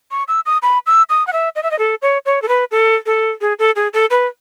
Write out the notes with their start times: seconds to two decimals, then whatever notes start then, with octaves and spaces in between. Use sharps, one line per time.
0.11 C#6
0.28 E6
0.46 D#6
0.62 B5
0.86 E6
1.09 D#6
1.27 F#5
1.33 E5
1.56 D#5
1.63 E5
1.71 D#5
1.79 A4
2.02 C#5
2.26 C#5
2.42 A4
2.48 B4
2.71 A4
3.06 A4
3.41 G#4
3.59 A4
3.76 G#4
3.93 A4
4.10 B4